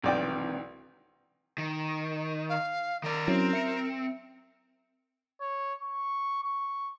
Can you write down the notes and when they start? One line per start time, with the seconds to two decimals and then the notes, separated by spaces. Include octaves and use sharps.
0.04 B1 C3 D#3 E3 D5 G5
1.58 D#3
2.49 F5
3.03 D#3 A#4 D5
3.27 F#3 C4 C#4 E4
3.53 E5 C#7
5.41 C#5
5.82 C#6
6.43 C#6